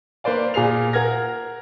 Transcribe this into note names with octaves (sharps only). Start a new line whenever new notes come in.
A#3 B4 C5 D5 F5
A#2 F4 G#4 C7 F7
A#4 F#5 F6 G#6 A#6